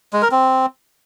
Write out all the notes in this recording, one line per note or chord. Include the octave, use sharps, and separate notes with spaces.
G#3
A#4
C4